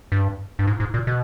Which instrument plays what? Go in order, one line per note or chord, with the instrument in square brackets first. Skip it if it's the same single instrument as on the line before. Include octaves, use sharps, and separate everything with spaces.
[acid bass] G2
G2
G#2
G#2
A#2
B2